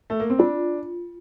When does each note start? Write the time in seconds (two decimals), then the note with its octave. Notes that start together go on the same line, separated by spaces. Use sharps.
0.10 A3
0.20 A#3
0.30 C4
0.39 D4 F4